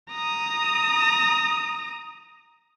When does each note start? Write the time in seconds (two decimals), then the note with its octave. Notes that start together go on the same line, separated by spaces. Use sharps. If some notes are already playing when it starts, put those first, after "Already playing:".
0.11 A#5 D#6